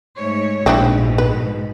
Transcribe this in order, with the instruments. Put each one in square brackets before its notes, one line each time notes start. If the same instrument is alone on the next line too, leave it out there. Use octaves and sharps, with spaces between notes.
[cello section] G#2 A3 C#5
[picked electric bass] A#1 [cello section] G#2 B2 [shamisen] C4 D4 E4
[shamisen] B4